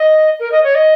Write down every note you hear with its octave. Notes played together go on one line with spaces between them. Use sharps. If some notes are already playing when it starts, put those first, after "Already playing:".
Already playing: D#5
A#4
D#5
C#5
D#5